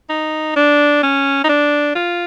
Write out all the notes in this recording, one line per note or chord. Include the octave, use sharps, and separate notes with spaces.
D#4
D4
C#4
D#4
D4
F4